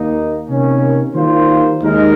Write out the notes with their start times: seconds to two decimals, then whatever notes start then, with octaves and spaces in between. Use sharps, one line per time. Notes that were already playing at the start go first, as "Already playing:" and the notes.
Already playing: D#2 D#3 A#3 D#4
0.48 C3 D#3 A#3 C#4
1.14 D#3 G3 A#3 F4 C5
1.81 D#2 D#3 G#3 D#4 A#4